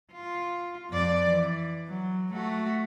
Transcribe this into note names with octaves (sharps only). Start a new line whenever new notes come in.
F4
F2 D5
E3
F#3
A3 F#4